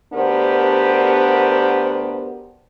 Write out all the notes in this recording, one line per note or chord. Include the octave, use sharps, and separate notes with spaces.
D2 B3 D4 G4 A#4 C5